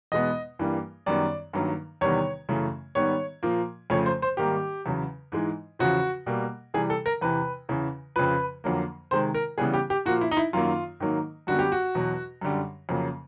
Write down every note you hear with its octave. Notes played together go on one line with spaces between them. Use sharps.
E2 B2 G#3 B3 D#5
G2 E3 G3 A#3
F#2 D#3 G3 B3 D5
G2 D#3 F#3 A#3
E2 C3 D#3 G3 B3 C#5
F#2 C#3 E3 A3
G#2 D#3 G3 B3 C#5
A#2 F3 A#3
F2 C#3 F3 A3 C#5
C5
C5
G#2 D#3 G3 A#3 G4
E2 C#3 F#3
G#2 E3 G#3
E2 C#3 F3 F#4
B2 G3 A#3
C3 E3 G3 G#4
A4
A#4
E2 C3 E3 B4
E2 C#3 E3
F2 C#3 F3 B4
F2 D3 F#3 A#3
C3 D#3 G#3 C5
A#4
C#3 E3 G3 B3 G#4
G4
G4
A#2 F3 A#3 F#4
E4
D#4
E4
F#2 D#3 F#3 A#3 F4
G#2 D#3 F#3 A#3
F#2 D3 G3 B3 F#4
G4
F#4
E2 B2 F#3
F#2 D3 G3
F2 C#3 F#3 A#3